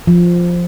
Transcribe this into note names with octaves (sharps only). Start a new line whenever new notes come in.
F3